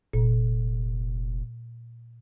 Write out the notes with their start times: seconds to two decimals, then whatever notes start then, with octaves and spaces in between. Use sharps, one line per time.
0.13 F1 A#2